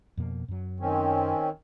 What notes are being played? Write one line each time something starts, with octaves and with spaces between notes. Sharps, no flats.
F2 B2 A#3
F#2 F#3
D#3 C4 C#4